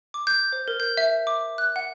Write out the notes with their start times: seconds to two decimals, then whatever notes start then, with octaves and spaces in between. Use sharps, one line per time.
0.14 D6
0.27 G6
0.52 C5
0.68 A#4
0.80 G6
0.97 E5
1.27 D6
1.58 F#6
1.76 F#5